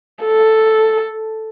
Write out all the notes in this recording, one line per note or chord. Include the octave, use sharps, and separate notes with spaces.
A4